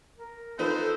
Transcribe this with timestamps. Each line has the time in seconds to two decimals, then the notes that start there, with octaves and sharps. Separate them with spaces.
0.18 A#4
0.59 F3 D#4 A4 B4 C5